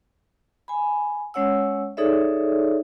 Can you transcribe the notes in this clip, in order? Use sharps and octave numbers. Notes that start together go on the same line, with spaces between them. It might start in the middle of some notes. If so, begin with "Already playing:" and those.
G#5 B5
G#3 C#4 C#5 F#5 E6
D#4 G#4 A4 C#5 D5 E5